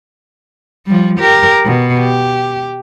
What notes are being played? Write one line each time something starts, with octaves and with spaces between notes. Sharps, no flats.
F3 G3
G4 A#4
B2
G4